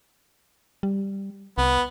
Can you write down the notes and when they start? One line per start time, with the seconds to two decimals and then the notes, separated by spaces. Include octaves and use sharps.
0.83 G3
1.58 C2 B3